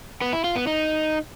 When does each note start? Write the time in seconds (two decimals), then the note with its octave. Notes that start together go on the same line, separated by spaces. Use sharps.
0.22 B3
0.33 E4
0.44 F4
0.56 B3
0.67 D#4